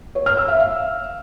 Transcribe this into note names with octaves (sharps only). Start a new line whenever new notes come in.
C#5
F6
E6
E5
F5